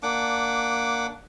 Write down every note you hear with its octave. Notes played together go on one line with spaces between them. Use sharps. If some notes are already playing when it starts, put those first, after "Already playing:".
A#3 D4 F#5 D6